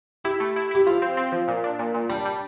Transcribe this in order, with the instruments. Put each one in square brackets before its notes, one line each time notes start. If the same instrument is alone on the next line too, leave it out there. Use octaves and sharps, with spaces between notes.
[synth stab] E4 [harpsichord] G4
[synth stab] A3
E4
[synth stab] E4 [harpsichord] G4
[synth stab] F3 [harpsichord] F4
[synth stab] C4
C4
F3
A#2
D4
A#2
A#2
[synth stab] G3 [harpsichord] D4
[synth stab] G3